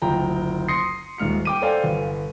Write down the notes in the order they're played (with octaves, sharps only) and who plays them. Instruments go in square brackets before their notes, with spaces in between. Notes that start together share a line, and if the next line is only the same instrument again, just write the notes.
[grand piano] F#1 D2 F3 G5 A#5
C6 D#6 A#6 C7 C#7
D#1 G#2 F6 C#7
G5 D6 D#7
A4 C5 D5 F5 G5 G#5
G1